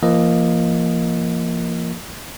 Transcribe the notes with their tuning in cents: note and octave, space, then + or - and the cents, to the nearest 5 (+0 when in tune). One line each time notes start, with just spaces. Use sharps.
F3 -35 A#3 +0 D#5 +0